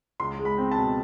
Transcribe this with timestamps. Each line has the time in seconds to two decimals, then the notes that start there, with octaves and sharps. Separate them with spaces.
0.20 C#2 C6
0.39 G#3
0.45 B5
0.58 C4
0.71 A5
0.78 B2